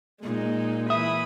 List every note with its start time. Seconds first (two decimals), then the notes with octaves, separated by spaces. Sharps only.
0.22 A#2 G#3 D#4
0.90 E3 E5 B5 D#6